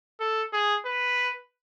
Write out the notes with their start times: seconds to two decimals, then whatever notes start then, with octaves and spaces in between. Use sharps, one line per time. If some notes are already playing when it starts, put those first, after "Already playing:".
0.20 A4
0.53 G#4
0.86 B4